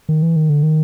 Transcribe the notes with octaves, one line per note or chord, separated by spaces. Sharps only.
D#3
E3
D#3
D3
D#3